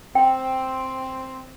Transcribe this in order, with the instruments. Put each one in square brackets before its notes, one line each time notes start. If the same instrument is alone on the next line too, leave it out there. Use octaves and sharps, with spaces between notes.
[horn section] C4 [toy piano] G5